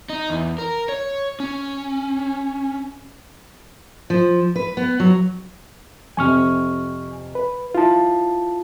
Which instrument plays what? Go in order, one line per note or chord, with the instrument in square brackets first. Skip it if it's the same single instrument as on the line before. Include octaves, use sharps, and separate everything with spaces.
[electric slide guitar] D#4
E2
A#4
C#5
C#4
[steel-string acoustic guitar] F3
B4
B3
F#3
[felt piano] F2 C3 [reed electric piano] G#5 C#6 F6
[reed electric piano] B4
[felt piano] E4 [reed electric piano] F4 A5